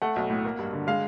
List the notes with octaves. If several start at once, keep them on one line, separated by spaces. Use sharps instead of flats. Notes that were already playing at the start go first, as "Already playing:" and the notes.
A3 F#5
B1
A2
A#3
G2
D3
G#3 F5